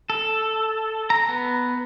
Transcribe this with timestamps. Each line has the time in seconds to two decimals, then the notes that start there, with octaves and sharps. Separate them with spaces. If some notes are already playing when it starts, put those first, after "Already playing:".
0.10 A4
1.10 A#5
1.28 B3